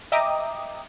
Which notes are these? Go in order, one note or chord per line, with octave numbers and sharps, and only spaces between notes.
D#5 E5 G5 A#5 D6 D#6